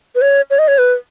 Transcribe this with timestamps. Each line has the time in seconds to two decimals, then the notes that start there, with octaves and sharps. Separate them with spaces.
0.15 B4
0.22 C#5
0.50 C#5
0.59 D#5
0.68 C#5
0.78 B4